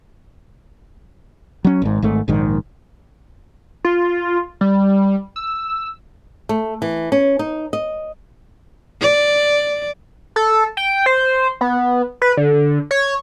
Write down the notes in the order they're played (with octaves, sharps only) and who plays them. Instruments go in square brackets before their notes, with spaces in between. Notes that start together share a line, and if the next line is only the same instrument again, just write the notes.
[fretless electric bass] F#3 C#4
G#1 G#2
G#1 G#2 A3
A#1 G#2 D#3
[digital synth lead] F4
G3
E6
[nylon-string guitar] A3
E3
C#4
D#4
D#5
[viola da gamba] D5
[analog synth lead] A4
G5
C5
B3
B4
D3
C#5